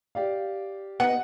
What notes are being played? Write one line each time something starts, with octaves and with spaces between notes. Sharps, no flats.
G4 D5 F5
B3 D#4 F#5